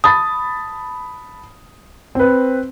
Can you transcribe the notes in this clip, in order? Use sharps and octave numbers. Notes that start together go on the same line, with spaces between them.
A5 B5 D#6 A6
C4 B4